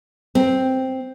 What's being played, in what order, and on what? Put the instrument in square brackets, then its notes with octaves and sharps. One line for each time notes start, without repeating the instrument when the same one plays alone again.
[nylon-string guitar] C4